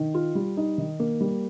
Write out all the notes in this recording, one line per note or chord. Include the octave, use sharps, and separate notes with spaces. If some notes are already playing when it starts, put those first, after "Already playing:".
Already playing: D#3
F4
G3
D#4
D#3
A#3
G3